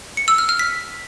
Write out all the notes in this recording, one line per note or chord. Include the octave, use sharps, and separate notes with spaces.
C#7
E6
F6
F6
B6